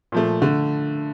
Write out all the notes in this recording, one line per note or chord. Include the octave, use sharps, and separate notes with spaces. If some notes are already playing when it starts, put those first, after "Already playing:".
A#2 F3 A3
D3 A3